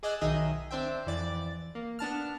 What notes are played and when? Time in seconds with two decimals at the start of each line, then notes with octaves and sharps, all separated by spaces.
0.03 G#4 D5 D#5 G#5 E6 F#6
0.21 B1 D#3 D#4 G#4 D#5 E5
0.71 C4 D4 C5 E5 G5
1.06 F2 E3 D5 A6
1.75 A#3
1.99 B3 D4 A5 F6